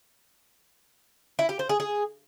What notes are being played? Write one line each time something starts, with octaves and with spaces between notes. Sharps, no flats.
E4
G4
C5
G#4
G#4